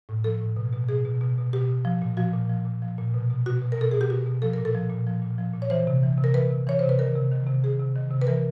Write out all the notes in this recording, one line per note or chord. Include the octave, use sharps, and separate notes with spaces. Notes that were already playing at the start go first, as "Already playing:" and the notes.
A2
F3 A4
A2
B2
B2
B2 G#4
B2
B2
B2
B2 G4
B2
F3
A#2
F3 F#4
A#2
F3
A#2
F3
A#2
B2
B2
B2 F#4
B2
A#4
B2 A4
B2 G#4
G4
B2 F#4
B2
F3 A4
A#2 A#4
A4
F3
A#2
F3
A#2
F3
A#2
C#5
E3 C5
C3
E3
C3
A#4
E3 B4
C3
E3 C#5
C3 C5
B4
D#3 A#4
C3
D#3
C3
D#3 G#4
C3
D#3
C3
B4
E3 A#4